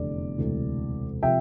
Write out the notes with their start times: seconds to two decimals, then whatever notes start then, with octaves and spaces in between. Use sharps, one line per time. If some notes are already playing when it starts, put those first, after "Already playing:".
Already playing: F1 E2 D3 D5
0.38 E1 D2 C3 E3
1.23 C3 F3 E5 G5